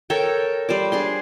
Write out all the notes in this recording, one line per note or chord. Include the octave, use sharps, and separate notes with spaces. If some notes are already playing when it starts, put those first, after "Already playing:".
A4 A#4 C#5 G5
G3 C5 D5
D4 G#4 C6